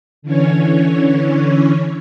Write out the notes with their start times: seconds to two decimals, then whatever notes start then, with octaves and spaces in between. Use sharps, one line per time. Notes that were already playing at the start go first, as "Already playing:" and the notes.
0.22 D3 E3 C#4 C#5